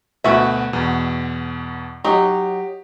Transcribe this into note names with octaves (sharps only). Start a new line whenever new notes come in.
D2 B2 F#4 E5
E2 B2
F#3 D#4 G4